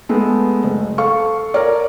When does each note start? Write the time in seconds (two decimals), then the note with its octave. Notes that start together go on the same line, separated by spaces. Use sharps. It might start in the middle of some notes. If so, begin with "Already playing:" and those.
0.09 G#3 A3 B3
0.64 F#1
0.98 A4 F5 C#6
1.54 A#4 C#5 D5